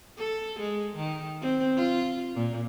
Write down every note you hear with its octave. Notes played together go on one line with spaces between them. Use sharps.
A4
G#3
D#3
C4
F4
A#2